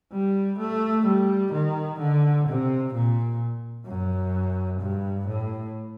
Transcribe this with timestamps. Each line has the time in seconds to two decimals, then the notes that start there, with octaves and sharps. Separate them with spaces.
0.13 G3
0.58 A3
1.05 G3
1.52 D#3
1.99 D3
2.46 C3
2.94 A#2
3.86 F#2
4.79 G2
5.27 A2